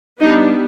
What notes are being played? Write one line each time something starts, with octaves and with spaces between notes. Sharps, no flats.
G3 B3 D4 D#4